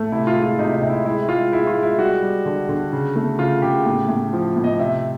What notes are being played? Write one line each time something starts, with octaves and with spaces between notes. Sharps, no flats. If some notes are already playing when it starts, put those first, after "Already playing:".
Already playing: A2 A3
C3 E4
F4
G#3
F4
C3 D#4
D#4
C3
E4
G#3 E4
G#3 F4
G#3 E4
F4
G#3
E4
G3 F#4
G3
D3
D3
C#3
A3
C#3 F4
C#3 G4
A2
A2
F3
A2
D#5
C3 E5